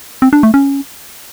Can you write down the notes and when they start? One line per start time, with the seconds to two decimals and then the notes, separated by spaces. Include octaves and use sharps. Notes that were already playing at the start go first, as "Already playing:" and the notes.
0.22 C4
0.33 D4
0.43 A3
0.54 C#4